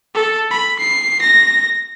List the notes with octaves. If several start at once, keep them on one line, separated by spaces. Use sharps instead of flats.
A4
B5
C7
A#6